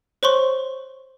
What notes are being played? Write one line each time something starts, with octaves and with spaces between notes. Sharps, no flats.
C5 C#5 C6 C#6